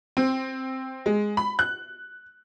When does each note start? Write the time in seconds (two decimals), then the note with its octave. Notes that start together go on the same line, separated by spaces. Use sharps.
0.17 C4
1.06 G#3
1.37 B5
1.59 F#6